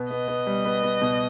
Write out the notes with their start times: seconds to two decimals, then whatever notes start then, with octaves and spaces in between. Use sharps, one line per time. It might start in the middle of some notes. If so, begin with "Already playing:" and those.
Already playing: B2 B3
0.10 B3 D#5
0.28 B3
0.47 G3
0.65 B3
0.83 B3
1.01 B2